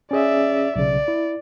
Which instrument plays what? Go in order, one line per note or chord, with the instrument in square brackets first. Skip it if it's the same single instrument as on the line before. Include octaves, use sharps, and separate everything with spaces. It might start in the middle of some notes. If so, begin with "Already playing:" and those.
[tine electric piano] C#4 G#4 [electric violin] D5 E5
[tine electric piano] B1 C#3 [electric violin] D5
[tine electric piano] E4